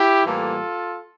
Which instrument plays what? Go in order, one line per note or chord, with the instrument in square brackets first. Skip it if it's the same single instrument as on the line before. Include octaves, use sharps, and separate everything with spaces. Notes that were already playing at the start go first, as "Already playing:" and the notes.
Already playing: [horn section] E4 G4
A2 E3 G3 A#3 F4 A4